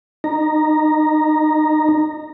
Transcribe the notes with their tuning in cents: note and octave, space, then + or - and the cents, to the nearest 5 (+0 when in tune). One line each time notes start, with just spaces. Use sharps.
D#4 -25 A#5 +0